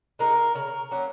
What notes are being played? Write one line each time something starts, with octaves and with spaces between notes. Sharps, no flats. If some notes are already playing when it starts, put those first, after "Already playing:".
G#3 D#4 A#4
C#3 A#4
F#3 A#3 C#4